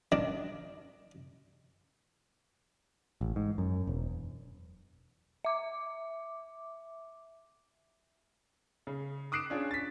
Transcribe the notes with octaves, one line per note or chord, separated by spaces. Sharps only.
D#3 D4
A1
G#2
F#2
E1
E5 D6
C#3
D6 D#6 F#6 C7 D7 E7
C#4 D4 F4 G#4
A6 B6